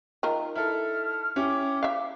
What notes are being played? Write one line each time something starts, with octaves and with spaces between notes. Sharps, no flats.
D#3 F4 A#4
E4 A4 F6
C#4 E4 G4 D6
E5 F5